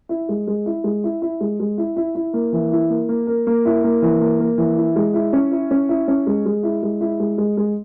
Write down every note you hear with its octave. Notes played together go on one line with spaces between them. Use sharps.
E4
G#3
G#3
E4
G#3
E4
E4
G#3
G#3
E4
E4
E4
A#3
E3
E4
A#3
A#3
A#4
A#3
E4
A#3
E3
A#3
A#3
E3
E4
G#3
E4
C#4
E4
C#4
E4
C#4
G#3
G#3
E4
G#3
E4
G#3
G#3
G#3